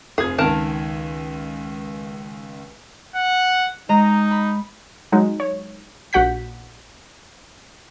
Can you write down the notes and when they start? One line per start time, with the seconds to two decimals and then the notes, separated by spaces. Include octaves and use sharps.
0.18 F1 F4 G#4 G#6
0.38 C#2 D#3 A#4 A5
3.16 F#5
3.89 G#3 D#4 D#5 A#5
4.31 B5
5.12 F#3 G#3 D#4
5.40 C#5
6.13 A#1 F#4 F#5 G6 B6